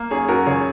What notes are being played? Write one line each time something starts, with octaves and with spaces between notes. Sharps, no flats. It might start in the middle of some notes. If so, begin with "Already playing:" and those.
Already playing: A#3
F#2 G#4 C#5
F#2 F#4 A#4
C#2 G#4 C#5